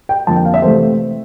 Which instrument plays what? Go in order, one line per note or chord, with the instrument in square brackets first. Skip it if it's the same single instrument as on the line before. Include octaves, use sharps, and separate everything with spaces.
[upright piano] G5
F2 D3 F3 A#3 A5
G5
F5
E5
C3 E3 A3 C5